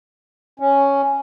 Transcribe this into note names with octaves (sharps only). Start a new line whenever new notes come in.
C#4